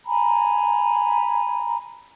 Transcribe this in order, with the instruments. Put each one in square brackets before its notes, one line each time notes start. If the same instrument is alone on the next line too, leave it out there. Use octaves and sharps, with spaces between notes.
[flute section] G#5 A#5 B5